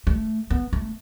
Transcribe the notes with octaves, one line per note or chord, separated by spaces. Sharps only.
A3
B3
A3